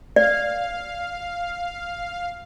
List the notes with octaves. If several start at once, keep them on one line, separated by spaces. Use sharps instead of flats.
D5 F5